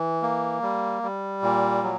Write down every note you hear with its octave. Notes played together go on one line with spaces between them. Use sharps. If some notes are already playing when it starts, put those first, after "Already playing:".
Already playing: E3
A#3
G3
G3
A#2
F#3